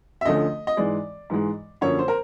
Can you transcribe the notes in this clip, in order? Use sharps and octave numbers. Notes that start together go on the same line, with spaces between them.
E5
D2 D3 F3 A3 C#4 D#5
D#5
G#2 E3 G#3 D5
G#2 E3 G#3
F#2 D3 F3 A#3 C#5
C5
A#4